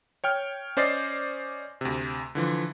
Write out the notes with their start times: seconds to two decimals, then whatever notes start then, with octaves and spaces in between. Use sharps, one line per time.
0.24 C#5 G5 F6
0.77 C#4 C5 D5 D#5 A6 C7
1.81 D2 C3
2.35 D3 E3 F3